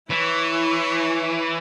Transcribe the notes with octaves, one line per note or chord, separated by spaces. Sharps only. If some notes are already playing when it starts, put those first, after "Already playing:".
E3 E4 C#5